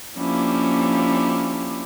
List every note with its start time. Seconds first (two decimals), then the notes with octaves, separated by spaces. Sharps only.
0.17 F3 A#3 C#4 D4 E4 G4